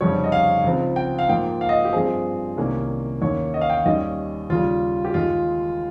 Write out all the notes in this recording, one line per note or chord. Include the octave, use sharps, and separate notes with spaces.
F1 F2 C#3 G3 C#5
D#5
F5
C#2 C#3 F3 C4
G5
F5
G#2 F3 A#3 G5
F5
D#5
G4
G2 F3 C4 G#4
C2 C3 D#3 A#3 C#4
D#2 D#3 A#3 C#4 C#5
D#5
F5
G5
F5
D#2 D#3 G3 C#4 D#5
D#2 C#3 G3 F4
G4
D#2 D#3 G#3 F4